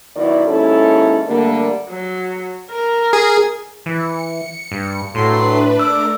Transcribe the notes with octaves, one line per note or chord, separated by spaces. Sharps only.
D#3 F#3 B3 E4 D5
D#2 G#2 C#4 E4 A4 C#5
D3 G3 A3 A#3
F#3
A#4
G#4
E3 C#7
G2
A2 F#3 A3 D4 B4 C6
A3 D4 A#4 D6 E6